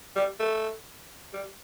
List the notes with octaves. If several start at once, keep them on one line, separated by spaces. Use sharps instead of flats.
G3
A3
G3